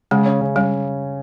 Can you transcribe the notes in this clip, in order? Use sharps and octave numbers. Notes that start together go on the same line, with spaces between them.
C#3 G#3
C#4
C#3
G3 C#4